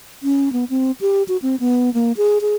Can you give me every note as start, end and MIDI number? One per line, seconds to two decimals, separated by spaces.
0.23 0.52 61
0.53 0.65 59
0.70 0.91 60
1.01 1.23 67
1.28 1.37 66
1.42 1.56 60
1.60 1.93 59
1.94 2.12 58
2.17 2.39 68
2.41 2.56 68